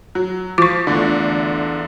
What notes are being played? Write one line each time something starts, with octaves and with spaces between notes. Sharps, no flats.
F#3
F3 C#6 D6
E2 D3 A3 F4